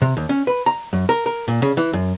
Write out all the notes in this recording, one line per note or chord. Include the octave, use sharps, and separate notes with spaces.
C3
D#2
C#4
B4
A#5
F#2
A#4
A#4
A#2
C#3
E3
F#2